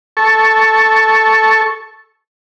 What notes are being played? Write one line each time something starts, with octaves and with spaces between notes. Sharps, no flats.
A4 C#6